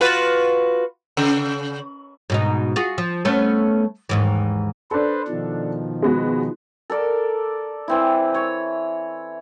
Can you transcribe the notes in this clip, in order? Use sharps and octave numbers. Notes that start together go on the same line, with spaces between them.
F4 F#4 B4
C#3
G#2 B2 D#4
F4 F#4 G#4
F3
A3 B3 C#4
D#2 G#2 E3
D4 A4 B4 C5
B2 D#3 F3
G#3 B3 F#4
A4 A#4 D5
E3 C4 E4
C#5